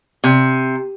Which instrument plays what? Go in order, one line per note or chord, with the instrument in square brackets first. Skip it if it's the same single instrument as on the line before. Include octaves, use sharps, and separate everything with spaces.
[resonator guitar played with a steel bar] C3